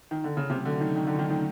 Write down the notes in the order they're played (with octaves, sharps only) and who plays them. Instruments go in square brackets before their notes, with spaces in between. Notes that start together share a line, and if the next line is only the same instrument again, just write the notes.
[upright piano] D#3
D3
C#3
[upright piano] C3 [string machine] F#3 A3 C#4
[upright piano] D3
D#3
D#3
D3
D#3
D#3